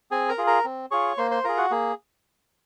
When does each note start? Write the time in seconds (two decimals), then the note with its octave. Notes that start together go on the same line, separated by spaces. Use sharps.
0.11 C4 G#4 G#5
0.29 A#4 A#5
0.38 F4 G#4
0.47 A#4 A#5
0.65 C4
0.91 F4 G#4 C#5 C#6
1.18 A#3 C5 C6
1.31 C5 C6
1.44 F4 G#4 A#4 A#5
1.57 F#4 F#5
1.71 A#3 G#4